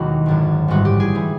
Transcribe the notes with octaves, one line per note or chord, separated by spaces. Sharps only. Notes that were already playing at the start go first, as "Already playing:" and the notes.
Already playing: E1 D#2 D#3 F#3 F#4
G#1 F#2 D3
A1 G#2 E3 G3 F#4
G4
G#4
E3 G3